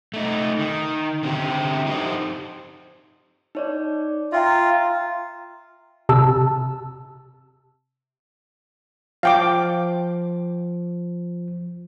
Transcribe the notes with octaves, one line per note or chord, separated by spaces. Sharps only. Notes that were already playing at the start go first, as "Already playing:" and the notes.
A3 D#4
D#3
D3 C4 G4
D#4 G4 C5
D#4 C#5 D5
F4 E5 G5 A#5
C3 A5 E6
F3 F5 G5 D6